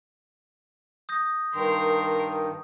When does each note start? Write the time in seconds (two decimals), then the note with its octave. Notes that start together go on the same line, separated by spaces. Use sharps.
1.09 D#6 G6 A#6
1.54 G2 D#3 A#4 C6